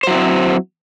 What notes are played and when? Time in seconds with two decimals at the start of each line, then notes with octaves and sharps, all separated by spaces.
0.03 C5
0.07 F#3
0.11 E4
0.15 C4